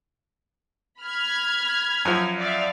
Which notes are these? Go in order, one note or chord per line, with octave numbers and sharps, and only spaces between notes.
B5 F6 G#6
F#2 F3
D5 E5 F5